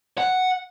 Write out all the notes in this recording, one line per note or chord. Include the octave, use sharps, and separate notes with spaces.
F#5